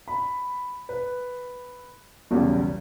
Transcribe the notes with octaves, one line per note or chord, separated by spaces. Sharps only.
B5
B4
B1 E2 C#3 G3